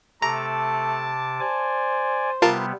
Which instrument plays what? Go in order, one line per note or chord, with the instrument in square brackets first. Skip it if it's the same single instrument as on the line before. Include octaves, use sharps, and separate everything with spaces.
[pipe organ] C3 D6 [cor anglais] A3 [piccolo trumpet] A5 [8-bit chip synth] A#5
[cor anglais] C5 [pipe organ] D5 G#5
[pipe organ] C3 G3 B3 [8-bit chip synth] F4 A#4 A5